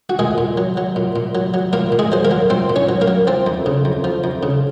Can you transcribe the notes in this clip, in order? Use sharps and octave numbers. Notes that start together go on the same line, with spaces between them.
F#4
A#2 G#3 G#4
A#2
F#3
F#3
A#2
A#2
F#3
F#3
A#2 A#3 A#4
A#2
G#3 G#4
F#3 C5
A#3 A#4
F#3
A#2 C4 C5
A#2
C#4 C#5
F#3
A#3 A#4
F#3
F3 C4
F2
C#3
F2
F3
F2
C#3